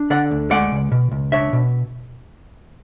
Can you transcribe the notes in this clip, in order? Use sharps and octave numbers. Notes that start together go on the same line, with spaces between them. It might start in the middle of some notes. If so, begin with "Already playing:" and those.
Already playing: D4
D3 D5 F#5
D2
G#3 D5 F#5
C#2
B2
C#2
D4 C#5 E5
B2